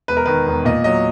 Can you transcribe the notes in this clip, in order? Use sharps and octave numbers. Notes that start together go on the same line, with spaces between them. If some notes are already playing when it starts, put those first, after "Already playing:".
E1 B4
A#4
D#3 B4
E1
A#2 D#5
F#3 D#5